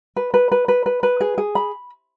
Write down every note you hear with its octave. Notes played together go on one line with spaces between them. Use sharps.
B4
B4
B4
B4
B4
B4
G#4
G#4
B5